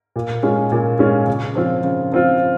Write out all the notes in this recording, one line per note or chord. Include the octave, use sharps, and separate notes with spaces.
A#2
G#3 C#4 F4
A#2
G#3 C#4 F4
C#3
F3 C4 F4
C#3
F3 C4 F4